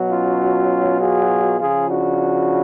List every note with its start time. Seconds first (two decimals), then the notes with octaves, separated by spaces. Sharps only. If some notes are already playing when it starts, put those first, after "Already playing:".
Already playing: B2 F#3
0.09 C#4 F4
0.99 F4 G#4
1.60 C#3 F3 F4 G#4
1.89 D4 F#4